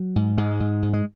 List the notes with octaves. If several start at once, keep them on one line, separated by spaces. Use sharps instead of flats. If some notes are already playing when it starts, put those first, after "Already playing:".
Already playing: F#3
G#2
G#2 G#3
G#2
G#2
G#3